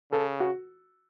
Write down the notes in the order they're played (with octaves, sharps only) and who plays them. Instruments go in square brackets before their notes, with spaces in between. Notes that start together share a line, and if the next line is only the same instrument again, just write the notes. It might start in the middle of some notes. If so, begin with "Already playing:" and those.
[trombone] C#3 [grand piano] A4
[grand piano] F#4